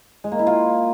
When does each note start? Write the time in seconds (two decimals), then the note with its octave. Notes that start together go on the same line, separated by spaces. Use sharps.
0.24 G#3
0.32 A#3
0.39 E4
0.47 F4